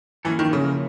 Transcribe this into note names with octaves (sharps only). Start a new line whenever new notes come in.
E3 F3 A#3 C#4 E4 A4
D#3
C#3